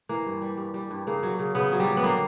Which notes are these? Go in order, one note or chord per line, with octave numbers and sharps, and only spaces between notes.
E3 A#3
G2
G3
G2
G3
G2
C#3 A#3
F#3
C#3
C#3 B3
F#3
G3
F#3
B3
D3 A#3